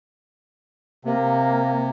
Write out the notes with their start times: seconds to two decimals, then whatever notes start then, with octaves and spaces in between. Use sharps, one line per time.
1.05 C3 A#3